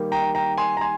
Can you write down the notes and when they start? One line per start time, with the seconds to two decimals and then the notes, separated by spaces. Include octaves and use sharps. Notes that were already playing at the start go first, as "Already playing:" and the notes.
Already playing: D#3 G3 A#3
0.12 G5 A#5
0.35 G5 A#5
0.58 G#5 C6
0.77 A#5
0.81 G#5 C6